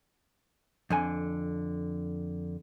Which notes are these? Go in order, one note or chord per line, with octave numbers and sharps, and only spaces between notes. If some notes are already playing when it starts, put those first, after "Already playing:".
F2 D3 G#5